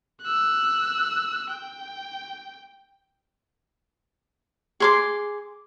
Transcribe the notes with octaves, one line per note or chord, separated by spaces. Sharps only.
E6 F#6
G5
G#4 C6 D6